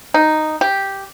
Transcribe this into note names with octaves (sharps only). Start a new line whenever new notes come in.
D#4
G4